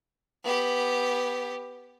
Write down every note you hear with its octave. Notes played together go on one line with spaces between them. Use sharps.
B3 G4